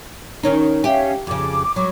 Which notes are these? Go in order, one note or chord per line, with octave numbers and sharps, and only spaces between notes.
D#3 C#4 D#4
C#4 G4 E5 F5
F2 C#3 D6
F#3 B5 C#6 D6